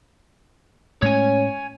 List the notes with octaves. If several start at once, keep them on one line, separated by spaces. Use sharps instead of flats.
A2 G#3 C#4 C#5 G#5